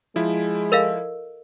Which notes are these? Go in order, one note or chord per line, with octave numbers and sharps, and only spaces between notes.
F3 G#3 E4
A4 A#4 D#5 F5